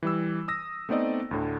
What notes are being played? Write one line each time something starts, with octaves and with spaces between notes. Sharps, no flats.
E3 G3 E6
D#6 E6 A#6
A3 B3 C4 D#4 D5 D#5
D2 A2 D3